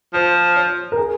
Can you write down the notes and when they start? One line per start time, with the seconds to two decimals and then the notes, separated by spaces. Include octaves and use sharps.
0.14 F3 C5
0.57 C#5
0.92 A#4
0.97 G#4